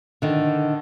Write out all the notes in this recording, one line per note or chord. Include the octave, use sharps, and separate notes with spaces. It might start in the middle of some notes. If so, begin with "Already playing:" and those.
D3 D#3